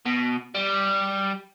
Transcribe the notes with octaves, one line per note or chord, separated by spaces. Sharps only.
B2
G3